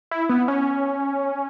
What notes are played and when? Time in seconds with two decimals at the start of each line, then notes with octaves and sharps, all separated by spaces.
0.11 E4
0.29 B3
0.48 C#4